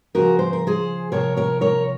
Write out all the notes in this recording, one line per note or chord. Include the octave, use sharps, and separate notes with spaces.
C#3 F3 F#4 A#4
C5
A#4
G#4 C5
C3 F3 A#4 C#5
A#4 C#5
A#4 C#5